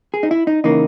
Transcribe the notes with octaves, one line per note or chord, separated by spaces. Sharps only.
G#4
D#4
E4
D#4
C#3 E3 A#3 D#4